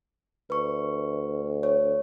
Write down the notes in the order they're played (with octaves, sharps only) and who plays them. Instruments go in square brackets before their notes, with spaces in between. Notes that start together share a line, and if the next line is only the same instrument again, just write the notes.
[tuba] D2 [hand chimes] B4 C#6
[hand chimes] C#5